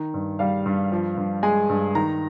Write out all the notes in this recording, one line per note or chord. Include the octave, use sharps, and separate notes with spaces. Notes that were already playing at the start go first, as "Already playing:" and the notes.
Already playing: D#3
G2
G3 F5
G2
F3
G2
G#3 G#5
G2
D#3 A#5